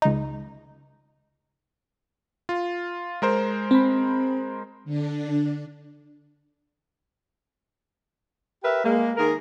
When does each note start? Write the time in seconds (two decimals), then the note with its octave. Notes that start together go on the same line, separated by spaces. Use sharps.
0.02 C#2 D#4
2.49 F4
3.22 G#3 A#4 C5
3.71 C4 B5
4.85 D3 D4
8.64 G4 A#4 B4 E5
8.83 G#3 A#3
9.17 D#3 G#4 A#4